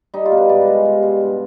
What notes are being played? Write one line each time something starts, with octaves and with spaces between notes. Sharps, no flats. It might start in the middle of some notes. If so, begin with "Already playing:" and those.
G3 D#4
F4
B2
B4
G#2 D5
D#5
G#3
F5
G3
B2
G2